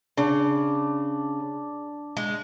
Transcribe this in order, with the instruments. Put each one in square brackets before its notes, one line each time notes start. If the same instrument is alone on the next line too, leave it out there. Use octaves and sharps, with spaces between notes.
[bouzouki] C#3 [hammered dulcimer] D4
[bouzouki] G#3